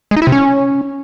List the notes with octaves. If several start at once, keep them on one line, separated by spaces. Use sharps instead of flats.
G#3
D#4
E4
C3
C#4